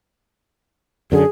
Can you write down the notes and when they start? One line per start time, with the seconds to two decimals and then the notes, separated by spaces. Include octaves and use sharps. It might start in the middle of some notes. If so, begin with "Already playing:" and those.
1.12 F#2 D3 G#4